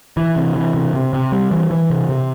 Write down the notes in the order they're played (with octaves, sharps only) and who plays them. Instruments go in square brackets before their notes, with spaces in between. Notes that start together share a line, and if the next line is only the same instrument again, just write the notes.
[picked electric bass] E3
C3
E3
C3
C3
C3
G3
E3
E3
C3
C3